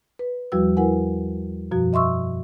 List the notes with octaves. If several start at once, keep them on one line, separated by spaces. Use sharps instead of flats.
B4
E2 F3 G3 F#4 B4 E6
E4 A#4 B4 F#5 G#5
F#2 B2 F3 F#4
D#5 E5 C6 C#6 E6